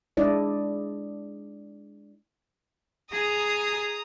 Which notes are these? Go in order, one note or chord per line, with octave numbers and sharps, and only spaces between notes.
G#3 D4 E4 D5 D#5
G#4 A#5 D#6